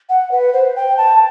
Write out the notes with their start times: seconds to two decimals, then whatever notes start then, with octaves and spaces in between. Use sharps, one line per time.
0.09 F#5
0.31 B4
0.53 C5
0.76 G5
0.97 A5